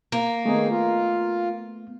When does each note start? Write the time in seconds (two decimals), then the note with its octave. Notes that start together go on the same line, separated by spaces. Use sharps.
0.12 A#3
0.46 D#3 A3 B3 D#4 G#4
0.70 F4